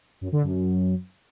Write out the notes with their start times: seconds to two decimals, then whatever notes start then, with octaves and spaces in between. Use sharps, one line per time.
0.21 F#2
0.32 D3
0.43 F#2